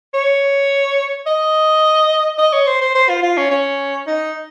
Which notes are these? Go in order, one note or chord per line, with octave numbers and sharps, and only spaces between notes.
C#5
D#5
D#5
C#5
C5
C5
C5
F4
F4
C#4
C#4
D#4